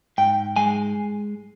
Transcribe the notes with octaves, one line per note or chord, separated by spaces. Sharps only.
G#2 G5
G#3 G#5